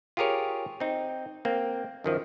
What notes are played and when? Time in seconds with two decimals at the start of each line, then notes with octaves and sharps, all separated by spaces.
0.17 F4 G4 G#4 A#4 C#5
0.80 C4 D#4
1.45 A#3 C4
2.04 F#2 D#3 F3